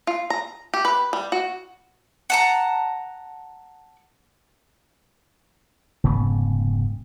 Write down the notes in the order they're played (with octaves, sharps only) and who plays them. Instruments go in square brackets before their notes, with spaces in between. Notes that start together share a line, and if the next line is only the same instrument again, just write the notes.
[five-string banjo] F4
A#5
G4
B4
G3
F#4
[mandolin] F#5 A5 A#5
[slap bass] F1 G#2 C#3 B3